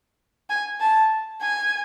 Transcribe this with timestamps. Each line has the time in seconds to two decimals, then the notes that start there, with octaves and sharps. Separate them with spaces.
0.49 G#5
0.80 A5
1.41 G#5